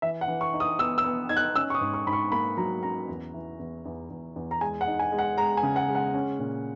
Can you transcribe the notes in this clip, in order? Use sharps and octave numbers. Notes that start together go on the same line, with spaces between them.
E3 E5
F#5
E3
C#6
D#4
D#6
B3 E6
E6
B3
D#4 G#6
F#6
C#4 E6
C#6
D#6
G#2
C#6
G#2 B5
C#6
A#3 B5
F#3 A#5
C#4 A#5
E2
E3
E2
E2
E2
E2
A#5
G#3 G#5
F#5
D#4
G#5
G#3
F#5
G#3 A#5
G#5
C#3
F#5
G#3
F#5
C#4
A#2